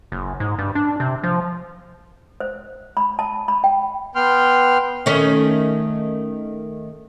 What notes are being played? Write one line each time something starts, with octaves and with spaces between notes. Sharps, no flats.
F#1
G#2
G2
D4
C3
F3
C5
B5
A5
B5
G5
B3 G5 C6 F6
D#3 A3 C#4